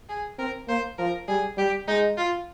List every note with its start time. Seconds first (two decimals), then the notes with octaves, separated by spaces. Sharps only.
0.09 G#4
0.38 C4 A#4
0.68 A#3 C5
0.98 F3 A#4
1.28 G3 G#4
1.57 G3 G4
1.88 G#3 D#4
2.17 F4